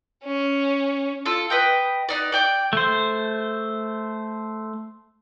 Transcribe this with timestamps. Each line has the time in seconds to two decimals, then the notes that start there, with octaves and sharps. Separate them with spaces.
0.25 C#4
1.25 F4 A4
1.50 B4 D#5 G5
2.09 B3 D#4 D5
2.32 D5 G5 D6
2.73 A3 C5